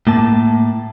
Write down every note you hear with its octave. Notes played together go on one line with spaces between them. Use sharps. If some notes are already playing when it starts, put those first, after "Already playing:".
A2 A#3 A5